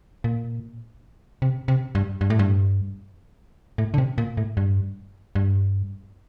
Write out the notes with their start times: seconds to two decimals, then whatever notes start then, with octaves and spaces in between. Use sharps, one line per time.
0.24 A#2
1.42 C3
1.68 C3
1.95 G2
2.21 G2
2.30 A2
2.39 G2
3.78 A2
3.94 D3
3.98 C3
4.18 A#2
4.37 A2
4.57 G2
5.35 G2